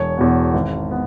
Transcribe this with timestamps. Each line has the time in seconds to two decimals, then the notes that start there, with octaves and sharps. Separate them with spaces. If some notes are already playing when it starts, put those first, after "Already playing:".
Already playing: E1 C#5
0.18 E2 B2
0.54 G#1
0.91 B3